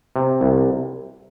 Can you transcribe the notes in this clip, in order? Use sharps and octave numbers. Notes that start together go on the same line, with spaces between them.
C3
C2